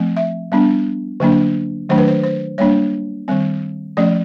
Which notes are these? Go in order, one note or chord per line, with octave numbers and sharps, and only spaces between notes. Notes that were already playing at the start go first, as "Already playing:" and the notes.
Already playing: F3 A3 C4
E5
G3 B3 D4
D3 F#3 A#3 D4
D#3 F#3 A3 D4 C5
B4
C5
C5
G3 A#3 D4 C#5
D#3 G3 C4
F3 A3 C#4 D5